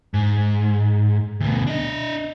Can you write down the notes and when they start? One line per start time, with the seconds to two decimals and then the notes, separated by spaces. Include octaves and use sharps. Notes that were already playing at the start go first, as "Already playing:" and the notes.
0.14 G#2
1.40 D2 B2
1.67 D4 D#5